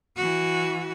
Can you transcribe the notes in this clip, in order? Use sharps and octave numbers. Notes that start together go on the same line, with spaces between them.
E3 F#4